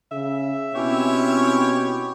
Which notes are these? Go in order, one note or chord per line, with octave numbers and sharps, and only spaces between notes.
C#3 E5
B2 C4 C#4 E4 G4 C#5